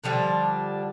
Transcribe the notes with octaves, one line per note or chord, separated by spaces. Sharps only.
D3 F3 G3 D4